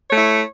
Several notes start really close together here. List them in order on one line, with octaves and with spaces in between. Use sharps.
C#5 A3 E4